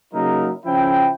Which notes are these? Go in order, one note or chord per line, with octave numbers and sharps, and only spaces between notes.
C#3 F#3 A#3 D#4 E4 A#4
C#3 F3 C#4 E4 G5